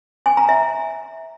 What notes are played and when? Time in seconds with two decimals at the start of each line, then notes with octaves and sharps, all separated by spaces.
0.26 G#5
0.37 A#5
0.49 E5